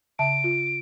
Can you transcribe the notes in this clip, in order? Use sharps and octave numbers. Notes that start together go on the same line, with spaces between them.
C#3 E5 A5 D7
F4